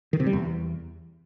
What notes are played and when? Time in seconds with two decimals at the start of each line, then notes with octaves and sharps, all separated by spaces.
0.13 D#3
0.20 C3
0.26 G3
0.33 E2